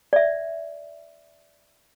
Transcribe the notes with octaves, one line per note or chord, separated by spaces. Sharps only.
D5 E5